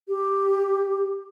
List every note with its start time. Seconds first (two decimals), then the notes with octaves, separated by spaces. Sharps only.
0.08 G4